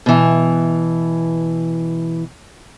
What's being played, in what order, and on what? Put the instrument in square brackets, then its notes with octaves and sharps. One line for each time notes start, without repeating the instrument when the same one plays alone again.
[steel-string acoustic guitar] B2 E3